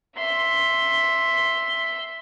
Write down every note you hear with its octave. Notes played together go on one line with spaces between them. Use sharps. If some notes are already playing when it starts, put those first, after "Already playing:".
E5 C6